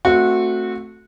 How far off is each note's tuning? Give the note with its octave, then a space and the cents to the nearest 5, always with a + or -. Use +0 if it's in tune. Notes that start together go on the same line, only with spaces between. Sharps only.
A3 +0 C4 +0 F#4 -20